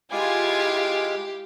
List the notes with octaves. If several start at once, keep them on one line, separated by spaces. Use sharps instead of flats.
G#3 E4 F4 G4 F5 G#5 D6 G#6